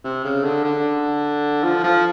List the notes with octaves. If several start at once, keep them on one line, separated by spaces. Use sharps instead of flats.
C3
C#3
D3
D3
F3
F3